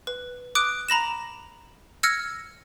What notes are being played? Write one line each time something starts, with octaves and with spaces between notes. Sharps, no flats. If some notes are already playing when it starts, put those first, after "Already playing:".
B4
D6 D#6 F#6 D7
A#5 B5 A#6 E7
E6 F6 G#6 A#6 C#7